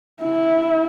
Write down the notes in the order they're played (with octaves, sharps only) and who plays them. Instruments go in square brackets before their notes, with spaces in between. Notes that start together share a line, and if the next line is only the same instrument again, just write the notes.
[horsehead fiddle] E4